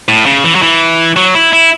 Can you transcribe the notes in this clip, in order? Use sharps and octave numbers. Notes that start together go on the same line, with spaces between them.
A2
C#3
E3
F#3
E3
F#3
E4
E4